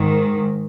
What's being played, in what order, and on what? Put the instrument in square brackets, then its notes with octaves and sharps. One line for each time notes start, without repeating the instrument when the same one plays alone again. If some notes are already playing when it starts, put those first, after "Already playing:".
Already playing: [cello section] G#2 D#3